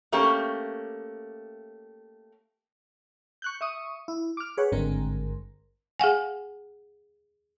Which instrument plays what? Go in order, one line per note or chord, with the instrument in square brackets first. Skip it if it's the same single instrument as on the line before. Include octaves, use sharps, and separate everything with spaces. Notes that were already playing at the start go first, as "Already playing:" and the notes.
[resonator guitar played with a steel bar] A3 A#3 C#4 G4
[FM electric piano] C#6 F#6 G6
E5 C#6 D#6
E4
D6 F6
G#4 B4 C#5 F#5
G#1 G2 D3 G#3 C4 A#4
[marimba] G#4 F5 F#5 G#5